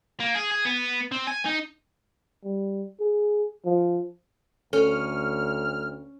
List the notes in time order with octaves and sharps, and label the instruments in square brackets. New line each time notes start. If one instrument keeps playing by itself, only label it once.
[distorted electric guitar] A#3
G#4
G#4
B3
C4
G#5
D#4
[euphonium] G3
G#4
F3
[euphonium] D2 [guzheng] C#4 [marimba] A4 [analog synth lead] F6